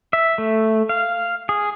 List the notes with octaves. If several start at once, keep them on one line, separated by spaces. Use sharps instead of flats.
E5
A3
F5
G#4